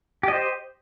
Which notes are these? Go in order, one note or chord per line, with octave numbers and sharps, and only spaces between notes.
G4 C5 D#5